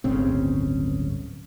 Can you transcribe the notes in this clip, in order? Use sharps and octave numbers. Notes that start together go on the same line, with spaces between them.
D1 G1 C#3 C4